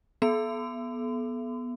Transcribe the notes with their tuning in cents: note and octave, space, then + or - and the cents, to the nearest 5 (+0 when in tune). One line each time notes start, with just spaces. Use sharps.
B3 -15 A4 -35 C6 -45